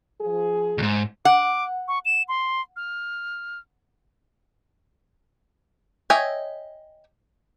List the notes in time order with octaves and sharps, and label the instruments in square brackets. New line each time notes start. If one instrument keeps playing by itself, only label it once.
[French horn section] F3 G#4
[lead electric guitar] D2 G#2
[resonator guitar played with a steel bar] F#5 [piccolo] D6
[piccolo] C#6
E7
C6
F6
[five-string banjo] C#5 D#5 E5 G5 G#5